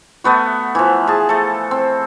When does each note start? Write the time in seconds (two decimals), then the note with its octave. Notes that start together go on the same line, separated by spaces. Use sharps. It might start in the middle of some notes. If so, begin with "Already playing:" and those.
0.24 A3 B3 F#4
0.75 E3 F3
1.07 G#4 A5
1.29 A3 A4
1.71 C4